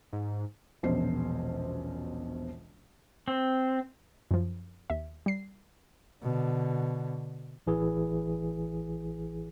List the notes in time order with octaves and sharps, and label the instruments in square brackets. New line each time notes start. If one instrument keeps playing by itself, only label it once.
[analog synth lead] G#2
[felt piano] E1 A#1 B2 C#4 C5 C7
[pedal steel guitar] C4
[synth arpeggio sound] F#2 F3
D#2 E5
G3 C7
[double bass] B2 D3
[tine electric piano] A1 E3 G#4